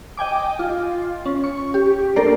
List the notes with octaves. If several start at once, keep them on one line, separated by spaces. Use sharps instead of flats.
D#5 G5 G#5 D6
F4
C#4
C#6
G4
A#3 D4 A4 A#4 D5 C7